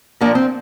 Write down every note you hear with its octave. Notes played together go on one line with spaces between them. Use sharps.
A#2 F3 A#3 D4
C4